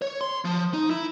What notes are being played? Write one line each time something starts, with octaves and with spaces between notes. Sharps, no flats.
C#5
C6
F3
D#4
E4